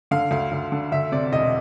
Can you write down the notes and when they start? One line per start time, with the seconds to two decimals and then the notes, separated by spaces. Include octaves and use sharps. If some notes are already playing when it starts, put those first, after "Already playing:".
0.11 D3 F5
0.31 D2 F5
0.52 D2
0.72 D3
0.92 D2 E5
1.12 C3 D5
1.32 E1 D#5